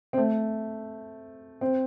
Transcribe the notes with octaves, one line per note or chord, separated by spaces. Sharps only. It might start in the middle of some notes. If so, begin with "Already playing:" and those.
C4
A3
C4